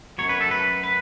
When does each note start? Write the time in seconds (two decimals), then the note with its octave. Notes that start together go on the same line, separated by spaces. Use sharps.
0.18 F#2 C#3 F#3 C#5
0.29 B4
0.41 A4
0.51 B4
0.84 B4